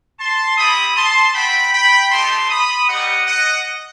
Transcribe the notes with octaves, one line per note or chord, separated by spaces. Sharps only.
A5 C6
C4 E4 G4 B5 D#6
A5 C6
C4 F#4 G5 B5
G5 B5
A3 D#4 G4 A5 C6
B5 D#6
G3 B3 D#4 G4 D#5 F#5
D#5 F#5